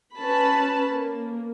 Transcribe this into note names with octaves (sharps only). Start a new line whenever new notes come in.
C#4 B4 A5 B5
A#3